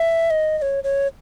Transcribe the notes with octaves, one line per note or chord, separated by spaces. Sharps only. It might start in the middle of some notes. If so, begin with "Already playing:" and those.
Already playing: E5
D#5
D#5
C#5
C#5